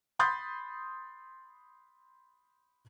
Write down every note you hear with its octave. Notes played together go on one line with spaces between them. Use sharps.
B5 C6 D#6 G6 A6